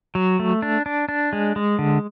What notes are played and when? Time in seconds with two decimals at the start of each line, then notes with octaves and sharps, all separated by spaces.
0.15 F#3
0.40 A3
0.62 D4
0.86 D4
1.09 D4
1.33 G#3
1.56 G#3
1.79 D3